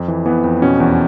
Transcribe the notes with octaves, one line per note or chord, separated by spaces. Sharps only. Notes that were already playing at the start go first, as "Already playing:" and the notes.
Already playing: F2
E3
E3 B3
F2
B2 C#4
E2